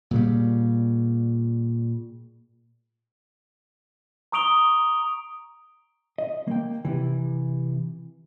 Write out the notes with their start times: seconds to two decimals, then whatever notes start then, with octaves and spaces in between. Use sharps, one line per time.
0.11 A#2 C#3 G3
4.32 A#5 C#6 D#6 D7 F7 G7
6.18 D#5
6.48 A#3 G5
6.85 C3 E3